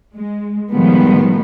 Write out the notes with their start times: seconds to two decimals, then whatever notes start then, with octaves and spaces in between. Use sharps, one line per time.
0.15 G#3
0.71 A2 D#3 F3 G3 G#3 B3